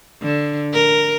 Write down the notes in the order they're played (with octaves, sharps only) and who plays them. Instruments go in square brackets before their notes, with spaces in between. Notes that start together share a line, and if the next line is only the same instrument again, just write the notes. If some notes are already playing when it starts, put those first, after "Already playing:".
[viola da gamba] D3
A#4